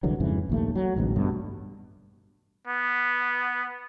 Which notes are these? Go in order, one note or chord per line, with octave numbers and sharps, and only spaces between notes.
C2 D3 E3 F#3
F2 G#2 C#3 E3
A#1 D#2 A3
F#3
A1 D2 G#2 B2
G2 B2 A3
B3